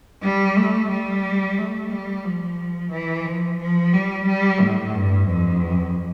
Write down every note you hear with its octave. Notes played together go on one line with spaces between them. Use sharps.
G3
A3
G3
A3
G3
F3
E3
F3
F3
G3
G3
A2
G2
F2